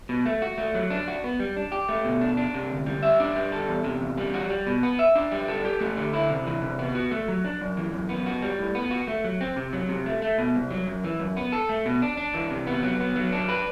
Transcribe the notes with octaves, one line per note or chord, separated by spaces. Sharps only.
B2
A3
F#4
A3
F#3
D4
F#4
B3
G3
D4
G4
A3
B2
D4
D4
C3
D2
G3
E5
D4
G3
A4
E2
C3
E2
G3
F#4
G3
B2
B3
E5
D4
G3
A4
G4
A3
D3
E4
C3
E3
C3
B3
F#4
A3
F#3
D4
F#2
E3
F#2
B3
F#4
G3
A2
B3
F#4
A3
F#3
C4
C3
F#3
C3
A3
A3
B2
C2
F#3
F#2
E3
F#2
B3
A4
A3
B2
D4
D4
E3
C3
B3
F#3
B3
F#3
D4
B4